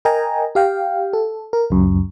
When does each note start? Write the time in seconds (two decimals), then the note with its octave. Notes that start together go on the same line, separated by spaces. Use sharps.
0.05 A#4 D#5 G5 G#5 A#5
0.55 G4 F5 G5
1.13 A4
1.53 A#4
1.70 C#2 F#2